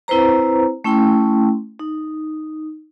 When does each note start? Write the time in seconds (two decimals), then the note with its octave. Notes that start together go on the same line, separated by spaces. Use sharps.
0.08 C4 E4 B4 C5 A#5
0.84 A3 C#4 E4 G5 C6
1.79 D#4